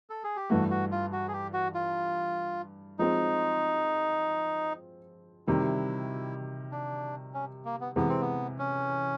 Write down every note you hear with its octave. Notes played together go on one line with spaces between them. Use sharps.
A4
G#4
G4
G2 E3 A3 F#4
F#4
F4
F#4
G#4
G4
F#4
F4
F3 G#3 C4 D#4
C3 D#3 G3 E4
D4
C#4
A#3
B3
C3 E3 G#3 B3
C4
B3
C#4